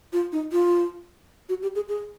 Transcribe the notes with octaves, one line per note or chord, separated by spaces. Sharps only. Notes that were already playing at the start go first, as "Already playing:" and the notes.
F4
D#4
F4
F#4
G4
G#4
G#4